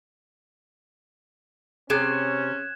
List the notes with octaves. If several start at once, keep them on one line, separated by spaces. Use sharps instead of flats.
C3 C#4 G#4 F#6 G#6 E7